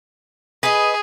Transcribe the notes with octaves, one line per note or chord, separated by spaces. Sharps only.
G#4 B4 D#5